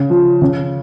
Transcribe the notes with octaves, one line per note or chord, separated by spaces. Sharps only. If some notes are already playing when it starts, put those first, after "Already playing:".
Already playing: C#3
F3
C#3